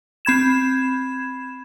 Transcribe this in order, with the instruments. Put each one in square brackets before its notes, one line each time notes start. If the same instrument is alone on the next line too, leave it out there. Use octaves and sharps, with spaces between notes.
[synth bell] C4 B5 G#6 E7